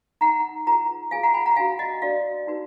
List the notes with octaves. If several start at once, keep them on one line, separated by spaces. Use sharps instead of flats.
D#4 A#4 F#5 A#5
F4 G#4 B4 F#5 A#5
F4 G#4 B4 F5 G#5
F#5 A#5
G#5 B5
F#5 A#5
D4 F#4 A#4 F5 G#5
D#5 F#5
D4 F#4 A#4 D5 F5
D#4 F#4 B4